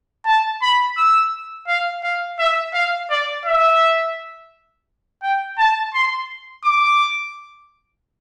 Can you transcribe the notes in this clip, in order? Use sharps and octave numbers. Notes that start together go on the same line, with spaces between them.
A5
B5
E6
F5
F5
E5
F5
D5
E5
G5
A5
C6
D6